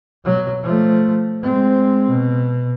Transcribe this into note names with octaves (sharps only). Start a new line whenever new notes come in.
B2 F#3
F3 A3
G#3 C4
B2